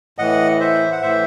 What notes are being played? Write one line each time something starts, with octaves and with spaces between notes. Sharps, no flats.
A2 E3 D#5 F#5
C5 E5
F#5
A2 E3 C5 E5